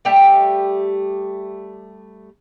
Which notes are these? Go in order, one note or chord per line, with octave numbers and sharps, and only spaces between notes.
G3 A3 G4 E5